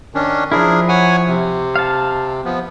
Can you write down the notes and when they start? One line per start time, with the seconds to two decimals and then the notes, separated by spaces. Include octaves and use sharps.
0.14 D#3 C#4 D4
0.52 F3 D4 E4 G#4 A#4
0.89 C#5 F#5 G#5
1.28 C3
1.76 F5 A5
2.45 F3 B3